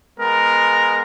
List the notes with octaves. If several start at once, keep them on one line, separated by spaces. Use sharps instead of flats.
G#3 B3 A#4